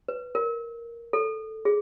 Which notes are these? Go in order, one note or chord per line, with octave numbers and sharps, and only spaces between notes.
B4
A#4
A4
G#4